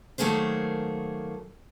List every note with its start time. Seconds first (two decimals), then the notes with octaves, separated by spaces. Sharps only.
0.18 D#3 F#3 A3 A#3 G#4 C5